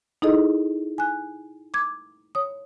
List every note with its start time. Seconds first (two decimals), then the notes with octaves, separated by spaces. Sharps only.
0.22 D#4 E4 G#4 A4 D#5
0.98 G#5 F#6
1.74 D6 G#6
2.35 C#5 D#6